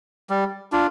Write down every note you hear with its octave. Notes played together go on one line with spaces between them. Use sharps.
G3
D4 F4